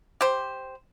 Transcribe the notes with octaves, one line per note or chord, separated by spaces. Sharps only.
G4 C5